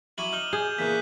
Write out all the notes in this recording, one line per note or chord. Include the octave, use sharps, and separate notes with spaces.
F#3 C#4 E4 D6 D#7 F#7
D#4 F6 G7
G#4 G6
E2 A#2 C#3 F#6 B6